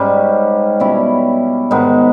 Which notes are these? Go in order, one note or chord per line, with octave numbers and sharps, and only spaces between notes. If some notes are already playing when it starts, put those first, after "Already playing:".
Already playing: G#2 G3 C#4
B2 G3 C#4 E4
G#2 D#3 G#3 B3